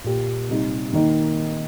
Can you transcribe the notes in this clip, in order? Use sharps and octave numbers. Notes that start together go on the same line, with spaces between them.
A#2 A#3 G4
C3 G3 D#4 G4
D#3 A#3 D#4